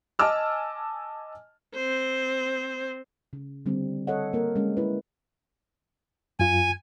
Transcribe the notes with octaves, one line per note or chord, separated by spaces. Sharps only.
D#5 G#5 A5 D6 E6 F6
C4 C5
C#3
D3 G3 C4
A4 C#5 D#5 F#5
A#3 A#4
G#3 C#4
E4 B4
F#2 F4 G#5